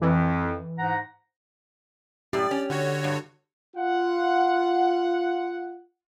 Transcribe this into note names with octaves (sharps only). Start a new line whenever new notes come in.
F2 E3
G#2 F#5 A#5
F#2 A2 G4 D5
C#4
D3 F#4 C#5
G2
F4 F#5